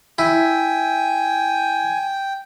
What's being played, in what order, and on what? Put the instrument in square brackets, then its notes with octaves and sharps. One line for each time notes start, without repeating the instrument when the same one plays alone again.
[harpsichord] E4 [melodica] G5 [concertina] G#5